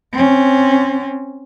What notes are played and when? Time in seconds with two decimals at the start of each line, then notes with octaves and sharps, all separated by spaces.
0.13 C4 C#4